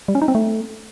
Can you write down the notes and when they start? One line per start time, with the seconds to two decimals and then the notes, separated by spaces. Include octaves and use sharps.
0.08 G3
0.15 C#4
0.22 D#4
0.28 C4
0.35 A3